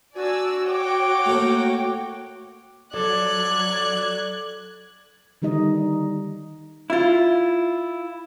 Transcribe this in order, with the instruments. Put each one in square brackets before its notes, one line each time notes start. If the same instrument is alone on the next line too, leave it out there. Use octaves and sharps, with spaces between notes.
[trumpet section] D4 G#5 [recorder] F#4 [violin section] D5 E6
[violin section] C#5 G5 [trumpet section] F#5 D6
[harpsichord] A3 A#3
[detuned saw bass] F#3 [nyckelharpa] A4 [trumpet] D5 [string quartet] F#6 G#6
[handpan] D3 D#3 G3 D#4 D#5
[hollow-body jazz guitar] E4 F4